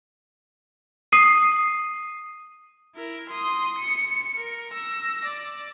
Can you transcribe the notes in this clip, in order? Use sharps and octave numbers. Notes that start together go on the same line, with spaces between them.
D#6 C7 D#7
E4 A#4
C6 D#6
C#7
A#4
E6 A#6
D5